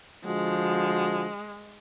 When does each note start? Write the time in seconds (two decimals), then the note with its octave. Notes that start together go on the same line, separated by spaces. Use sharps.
0.25 D3 F3 G#3 F#4